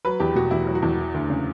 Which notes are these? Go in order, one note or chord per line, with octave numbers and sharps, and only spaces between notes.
F#3 B4
E2 G4
B2 F#4
E2 E4
F#3
F#4
E2
E3
D2
C#3